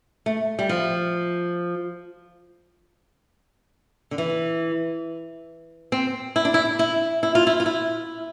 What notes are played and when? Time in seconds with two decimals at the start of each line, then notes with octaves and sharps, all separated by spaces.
0.26 A3
0.59 G3
0.69 F3
4.11 D3
4.18 E3
5.92 C4
6.36 E4
6.45 D4
6.54 E4
6.79 E4
7.23 E4
7.35 F4
7.47 E4
7.60 F4
7.66 E4